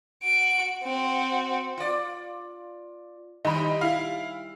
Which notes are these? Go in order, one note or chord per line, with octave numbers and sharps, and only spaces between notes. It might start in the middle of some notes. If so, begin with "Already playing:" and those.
F#4 D7
C4 F#4
F4 D5
D#3 G3 D#4 B5
E4 F5